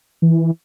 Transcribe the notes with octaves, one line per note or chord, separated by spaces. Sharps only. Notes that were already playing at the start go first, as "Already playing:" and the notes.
E3